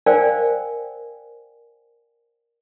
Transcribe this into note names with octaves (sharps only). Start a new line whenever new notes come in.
A#4 C5 D5 F5 G5 G#5